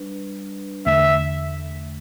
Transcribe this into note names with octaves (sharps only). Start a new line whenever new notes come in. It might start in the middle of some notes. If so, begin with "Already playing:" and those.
Already playing: G3 D4 B4
E2 D3 A3 E5